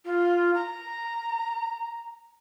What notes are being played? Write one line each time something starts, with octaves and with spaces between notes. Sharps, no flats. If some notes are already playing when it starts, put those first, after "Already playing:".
F4
A#5